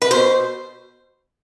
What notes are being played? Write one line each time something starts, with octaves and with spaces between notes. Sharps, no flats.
B4
B2 C5